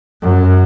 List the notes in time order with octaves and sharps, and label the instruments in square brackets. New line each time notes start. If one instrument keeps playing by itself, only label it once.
[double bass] F#2